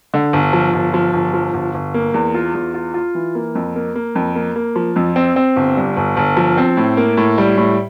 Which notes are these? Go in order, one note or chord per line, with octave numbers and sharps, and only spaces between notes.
D3
G1
F3
G1
F3
G1
F3
G1
G1
A#3
E2
F4
E2
F4
F4
E3
A#3
F2
A#3
A#3
F2
A#3
A#3
F3
F2
C4
C4
G1
G2
G1
G1
F3
C4
A2
A#3
A2
G3
A2